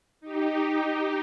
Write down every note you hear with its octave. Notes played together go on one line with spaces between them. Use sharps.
D#4 G4